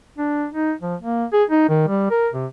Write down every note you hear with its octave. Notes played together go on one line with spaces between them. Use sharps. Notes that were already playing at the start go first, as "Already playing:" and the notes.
D4
D#4
F3
A#3
G#4
D#4
D#3
G3
A#4
C3